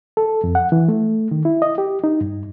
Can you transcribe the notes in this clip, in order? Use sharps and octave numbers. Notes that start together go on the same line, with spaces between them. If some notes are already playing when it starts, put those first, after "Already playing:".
A4
F2
F#5
E3
A3
D#3
E4
D#5
G4
D#4
G2